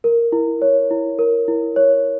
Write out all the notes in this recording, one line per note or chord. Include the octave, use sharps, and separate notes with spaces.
A#4
E4
C#5
E4
A#4
E4
C#5